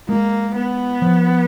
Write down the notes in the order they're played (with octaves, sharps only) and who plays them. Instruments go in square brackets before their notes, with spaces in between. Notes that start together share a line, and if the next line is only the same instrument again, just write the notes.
[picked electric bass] G#3 [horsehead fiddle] A#3
[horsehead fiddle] B3
[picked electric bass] F3